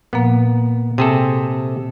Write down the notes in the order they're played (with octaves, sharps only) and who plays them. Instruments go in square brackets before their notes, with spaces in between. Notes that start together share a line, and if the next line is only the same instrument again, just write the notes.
[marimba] A#2 F3 A#3 [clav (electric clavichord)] B3
[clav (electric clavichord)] C3 G#4 A4 [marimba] G5